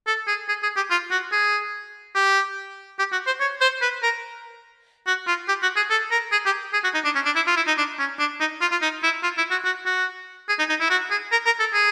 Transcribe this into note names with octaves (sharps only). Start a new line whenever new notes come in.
A4
G#4
G#4
G#4
G4
F4
F#4
G#4
G4
G4
F#4
C5
C#5
C5
B4
A#4
F#4
F4
G4
F#4
G#4
A4
A#4
G#4
G4
G#4
F#4
D#4
D4
C#4
D4
E4
F4
E4
D#4
D4
C#4
D4
D#4
F4
F4
D#4
E4
F4
E4
F#4
F#4
F#4
G#4
D#4
D#4
E4
F#4
G#4
A#4
A#4
A4
G#4